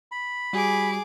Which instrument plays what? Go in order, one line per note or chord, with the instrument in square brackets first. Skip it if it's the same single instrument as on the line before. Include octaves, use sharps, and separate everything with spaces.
[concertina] B5
[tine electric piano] G3 F#4 [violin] G#4 D6